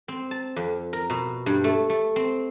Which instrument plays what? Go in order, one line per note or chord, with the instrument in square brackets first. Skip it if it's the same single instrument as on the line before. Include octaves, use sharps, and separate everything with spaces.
[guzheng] C4
A5
F2
A#4
B2
G2
A3
A3
C4